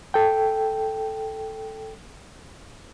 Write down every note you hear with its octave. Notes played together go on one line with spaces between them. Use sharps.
A4 G5